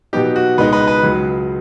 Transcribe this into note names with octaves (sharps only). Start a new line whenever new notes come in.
B2 F#3 B3 D#4 G4
F#4
C#2 B2 G#3 B3 D#4 B4
B4
B4
C#2 C#3 F#3